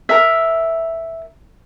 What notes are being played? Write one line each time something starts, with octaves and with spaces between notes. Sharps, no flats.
A#4 E5